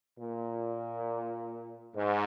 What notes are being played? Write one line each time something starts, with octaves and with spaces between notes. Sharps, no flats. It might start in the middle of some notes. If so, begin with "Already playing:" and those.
A#2
G#2